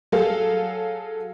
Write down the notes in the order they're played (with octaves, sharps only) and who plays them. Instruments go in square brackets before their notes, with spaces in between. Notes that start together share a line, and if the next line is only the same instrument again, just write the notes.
[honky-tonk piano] F#3 G#4 A4 F5